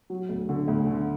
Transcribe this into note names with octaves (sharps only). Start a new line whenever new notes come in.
F#3
D2
D3
D2
D3